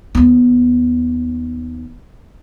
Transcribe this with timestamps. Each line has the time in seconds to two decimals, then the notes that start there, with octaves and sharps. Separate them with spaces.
0.15 D#2 B3